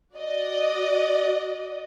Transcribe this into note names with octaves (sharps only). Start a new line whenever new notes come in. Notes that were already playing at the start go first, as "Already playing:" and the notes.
F#4 D5 D#5